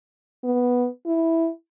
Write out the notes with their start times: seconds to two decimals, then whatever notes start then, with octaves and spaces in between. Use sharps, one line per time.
0.44 B3
1.06 E4